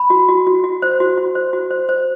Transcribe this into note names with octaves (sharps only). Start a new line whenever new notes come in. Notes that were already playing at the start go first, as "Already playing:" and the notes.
Already playing: B5
F#4
F#4
F#4
F#4
C5
F#4
F#4
C5
F#4
C5
C5